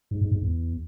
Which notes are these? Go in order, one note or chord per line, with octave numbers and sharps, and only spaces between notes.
G#2
G#2
G#2
E2